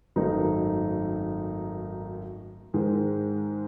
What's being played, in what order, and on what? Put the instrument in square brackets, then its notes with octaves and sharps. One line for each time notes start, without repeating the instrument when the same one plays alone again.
[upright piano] G#1 F#2 D#3 A3 D#4
G#2 D#3 G#3